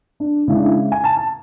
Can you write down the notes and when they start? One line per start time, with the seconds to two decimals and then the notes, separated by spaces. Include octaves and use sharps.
0.20 D4
0.48 C#3 G#3 E4
0.56 D4
0.63 E4
0.92 G#5
1.04 A5
1.17 A5